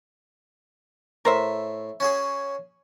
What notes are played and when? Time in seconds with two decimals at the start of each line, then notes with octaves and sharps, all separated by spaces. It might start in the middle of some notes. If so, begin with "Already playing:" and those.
1.25 A2 A#4 C5 E5
2.00 C#4 F#4 G#4